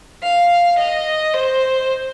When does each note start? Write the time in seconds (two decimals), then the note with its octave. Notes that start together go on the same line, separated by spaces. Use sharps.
0.23 F5
0.78 D#5
1.34 C5